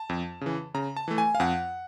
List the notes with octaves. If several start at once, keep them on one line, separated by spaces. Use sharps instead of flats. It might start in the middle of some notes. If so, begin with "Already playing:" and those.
Already playing: A5
F2
C#3 E3
C#3 A#5
A5
E3 A3
G#5
F5
F2 F#5